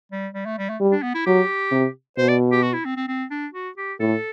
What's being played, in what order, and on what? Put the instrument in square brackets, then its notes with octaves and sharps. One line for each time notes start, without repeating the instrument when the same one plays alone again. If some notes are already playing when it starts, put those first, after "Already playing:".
[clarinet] G3
G3
A3
G3
A3
[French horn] G3
[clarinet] D4
B3
E4
[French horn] F#3 [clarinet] G4
[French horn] C3
[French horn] B2 [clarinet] C5
[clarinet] D5
G4
F#4
E4
C4
C4
C4
D4
F#4
G4
[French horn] A2 [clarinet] A4